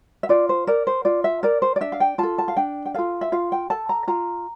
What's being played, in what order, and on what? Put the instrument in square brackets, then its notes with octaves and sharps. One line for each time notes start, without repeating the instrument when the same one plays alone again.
[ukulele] E5
F4 D5
C5
A#4 D5
C5
F4 D5
E5
A#4 D5
C5
D5
D4 E5
F5
G5
F4 A4 A5
A5
F5
D4 G5
G5
F4 A4 F5
E5
F4 F5
G5
A4 A5
A#5
F4 A#5